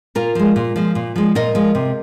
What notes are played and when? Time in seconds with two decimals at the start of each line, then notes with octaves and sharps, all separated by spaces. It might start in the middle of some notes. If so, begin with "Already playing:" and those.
0.15 A#2 F4 A#4
0.35 F3 G#3
0.56 A#2
0.76 F3 G#3
0.95 A#2
1.16 F3 G#3
1.35 A#2 A#4 D#5
1.55 F3 G#3
1.75 C3